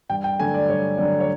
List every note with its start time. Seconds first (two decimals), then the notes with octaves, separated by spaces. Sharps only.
0.09 G2 G5
0.24 G5
0.39 D3 F#3 A3 G#5
0.54 D5
0.69 G2 C#5
0.98 D3 F#3 A3 D5
1.20 C#5